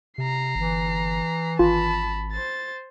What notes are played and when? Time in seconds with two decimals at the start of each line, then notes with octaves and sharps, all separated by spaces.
0.18 C3 A#5 C7
0.55 G1 E3
1.59 G#1 F4 A5 B5
2.32 C5 A6